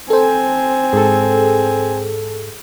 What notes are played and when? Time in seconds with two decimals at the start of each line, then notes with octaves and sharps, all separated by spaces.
0.10 C4 A4 C5 G#5
0.93 G#2 G#4 A4